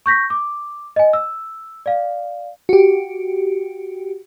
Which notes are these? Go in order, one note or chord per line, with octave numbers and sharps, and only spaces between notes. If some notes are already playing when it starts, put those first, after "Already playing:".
C#6 G6 A#6 B6
D6
D#5 G#5
E6
D5 F5
F#4 G4